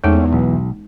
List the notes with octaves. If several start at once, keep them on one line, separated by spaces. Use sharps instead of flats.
E2 G#3 A3 C4 C#4 D#4
B1